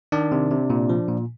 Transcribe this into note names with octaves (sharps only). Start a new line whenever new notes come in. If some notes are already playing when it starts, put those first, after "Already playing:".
D#3 D4 D5
C3
C3
A#2
F3
A#2